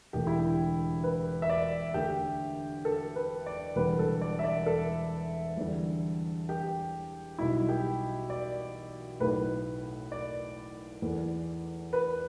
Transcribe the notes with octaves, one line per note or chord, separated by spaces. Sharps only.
E1 D2 D3 G4
E4
G4
B4
E5
D5
D2 D3 A3 G4
A4
B4
D5
E1 E2 D3 G3 B4
A4
D5
E5
D5
A4
E2 D3 G3
G4
B1 B2 G3 E4
G4
D5
B1 A2 A3 B4
D5
E2 E3 A3
B4